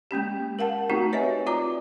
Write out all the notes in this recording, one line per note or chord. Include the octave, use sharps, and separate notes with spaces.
G#3 A#3 C#4 G4
A#4 F5 F#5 A5
A3 C4 D#4 F#4 G4
B4 C#5 D#5 E5 G#5
F4 D5 A#5 D6